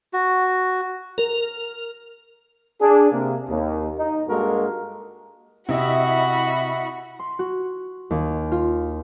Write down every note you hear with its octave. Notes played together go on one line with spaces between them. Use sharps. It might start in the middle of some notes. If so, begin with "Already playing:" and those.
F#4
A#4 F7
D4 G#4
C3 A#3
D#2
D#4
G2 G#3 A#3 F#4 A4 A#4
C3 E4 F#4 D#5 E5 B5
C6
F#4
D#2
F4